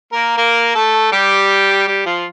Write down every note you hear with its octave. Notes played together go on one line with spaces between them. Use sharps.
A#3 A#4
A#3 A#4
A3 A4
G3 G4
G3 G4
F3 F4